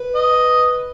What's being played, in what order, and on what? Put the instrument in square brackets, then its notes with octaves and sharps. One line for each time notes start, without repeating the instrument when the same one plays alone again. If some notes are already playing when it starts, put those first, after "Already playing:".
Already playing: [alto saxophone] B4
[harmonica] D#5